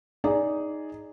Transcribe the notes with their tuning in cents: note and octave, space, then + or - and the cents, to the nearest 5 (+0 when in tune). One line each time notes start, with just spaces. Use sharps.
D#4 +0 G#4 +0 D5 -20